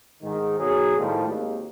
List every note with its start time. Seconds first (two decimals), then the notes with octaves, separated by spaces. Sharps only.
0.22 G#2 D#3
0.58 B1 F#3 G#4
0.98 A2 D#3 F3 G3
1.28 G#1 D#2